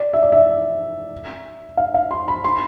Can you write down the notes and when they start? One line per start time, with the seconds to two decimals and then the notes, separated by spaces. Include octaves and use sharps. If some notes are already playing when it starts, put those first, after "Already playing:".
Already playing: D5
0.13 E5
0.23 D5
0.32 E5
1.77 F5
1.94 F5
2.11 C6
2.28 B5
2.44 C6